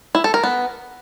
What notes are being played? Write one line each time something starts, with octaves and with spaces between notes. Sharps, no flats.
E4
A4
A#4
B3